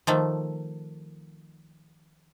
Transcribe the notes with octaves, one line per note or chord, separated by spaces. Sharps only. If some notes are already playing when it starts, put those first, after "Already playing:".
D#3 F3 A3